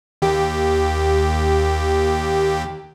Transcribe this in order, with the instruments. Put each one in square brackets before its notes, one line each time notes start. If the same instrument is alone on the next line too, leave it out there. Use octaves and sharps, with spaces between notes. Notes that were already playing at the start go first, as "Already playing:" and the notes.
[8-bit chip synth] D#2 G4